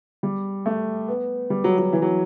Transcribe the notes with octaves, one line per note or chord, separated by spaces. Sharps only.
G3
A3
B3
G3
F#3
F#3
E3
F#3